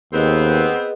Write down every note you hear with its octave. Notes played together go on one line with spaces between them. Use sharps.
D#2 B3 C4 G#4 B4 D#5